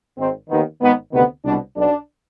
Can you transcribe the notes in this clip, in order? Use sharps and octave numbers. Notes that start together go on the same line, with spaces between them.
G#1 G#2 D#3 C4
D#2 D#3 B3
G#1 G#2 D#3 B3
D2 C3 D#3 B3
C2 B2 D4
B1 B2 D4